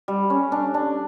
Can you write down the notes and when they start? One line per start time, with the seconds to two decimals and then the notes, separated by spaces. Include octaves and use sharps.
0.08 G3
0.30 C#4
0.52 D4
0.74 D4